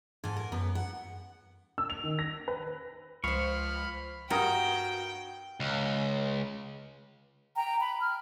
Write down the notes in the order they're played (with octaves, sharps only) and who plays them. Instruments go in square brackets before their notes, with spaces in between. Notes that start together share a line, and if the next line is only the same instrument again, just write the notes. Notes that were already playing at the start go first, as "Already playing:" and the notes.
[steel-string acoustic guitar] G#2 A4 G#5
A#4
F#2 B3
F#5
[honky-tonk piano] E6
F7
D#3
A#6
B4
[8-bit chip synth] C#2 [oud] F3 C5 [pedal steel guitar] F5 C#6 [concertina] B5 F6
[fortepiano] G2 A#4 D#6 [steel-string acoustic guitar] F#4 [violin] G5
[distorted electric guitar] C#2
[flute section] G5 A#5
B5
F6